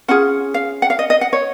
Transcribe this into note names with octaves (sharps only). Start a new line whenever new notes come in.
C#4 F4 G#4 F#5
F5
F#5
F5
D#5
D#5
F#5
C#5